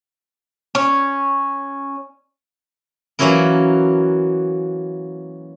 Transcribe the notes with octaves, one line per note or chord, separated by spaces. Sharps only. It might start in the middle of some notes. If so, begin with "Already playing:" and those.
C#4
E3 F#3 A#3 C#4 E4 A#4